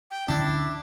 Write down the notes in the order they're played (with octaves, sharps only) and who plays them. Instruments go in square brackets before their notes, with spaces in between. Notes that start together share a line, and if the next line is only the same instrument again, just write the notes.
[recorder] G5
[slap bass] D2 D3 C#4 [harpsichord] D4 [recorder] E4